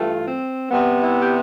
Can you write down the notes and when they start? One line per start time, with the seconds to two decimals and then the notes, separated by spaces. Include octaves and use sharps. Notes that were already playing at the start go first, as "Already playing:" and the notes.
Already playing: G2 E3 A3 F4
0.27 C4
0.71 C3 G3 B3
1.01 E4
1.22 G4